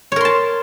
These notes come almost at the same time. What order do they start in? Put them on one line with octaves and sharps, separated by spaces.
C#5 A#4 C6 A5